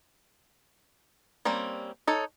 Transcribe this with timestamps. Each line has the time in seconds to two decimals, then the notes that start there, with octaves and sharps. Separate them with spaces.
1.45 G3 A#3 C4 C#4
2.07 D#4 A4 C#5